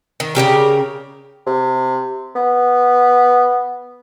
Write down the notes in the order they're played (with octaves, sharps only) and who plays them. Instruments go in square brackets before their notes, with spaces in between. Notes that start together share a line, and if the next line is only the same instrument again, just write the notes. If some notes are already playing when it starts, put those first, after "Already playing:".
[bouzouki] D#3
C#3 G3 G4 A#4
[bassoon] C3
B3